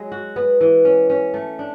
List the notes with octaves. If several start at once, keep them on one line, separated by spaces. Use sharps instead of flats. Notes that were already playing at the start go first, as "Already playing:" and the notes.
Already playing: F#3 G#3
F#4
B3
E3
C#4
C#4
A3
D4